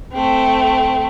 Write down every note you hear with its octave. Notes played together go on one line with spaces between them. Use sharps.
A3 C4